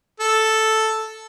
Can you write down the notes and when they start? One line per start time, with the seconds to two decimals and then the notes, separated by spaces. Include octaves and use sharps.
0.20 A4